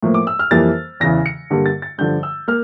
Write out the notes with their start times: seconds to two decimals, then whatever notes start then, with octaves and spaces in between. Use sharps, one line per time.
0.03 A2 F3 A#3
0.14 D6
0.27 E6
0.39 F6
0.51 F2 E3 G3 A#3 A6
1.00 E2 C#3 E3 A#6
1.26 C#7
1.50 G2 D3 G3 A#3
1.66 A6
1.82 A6
1.98 G2 D3 F3 G6
2.23 E6
2.48 A#3 F6